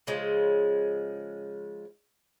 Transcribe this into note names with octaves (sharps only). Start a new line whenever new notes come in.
C#3 F3 G#3